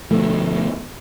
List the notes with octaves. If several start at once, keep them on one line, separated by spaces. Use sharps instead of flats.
D2 B2 F3 A3